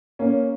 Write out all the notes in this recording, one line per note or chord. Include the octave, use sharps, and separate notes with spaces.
A#3 C#4